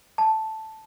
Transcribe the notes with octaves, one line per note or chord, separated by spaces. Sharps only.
A5